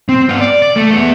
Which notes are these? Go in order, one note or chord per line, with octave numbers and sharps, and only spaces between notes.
C4
B3 F4
D5
D5
A3
B3 E5